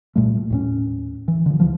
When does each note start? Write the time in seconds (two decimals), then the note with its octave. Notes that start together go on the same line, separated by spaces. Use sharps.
0.16 C2 A#2 G3 A3
0.50 D#2 A2 C#4
1.28 E3
1.46 D3 F3
1.60 D2 E3 F3